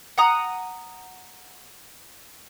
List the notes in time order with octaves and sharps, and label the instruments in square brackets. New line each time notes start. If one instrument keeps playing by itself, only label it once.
[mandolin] F#5 A#5 D#6 F#6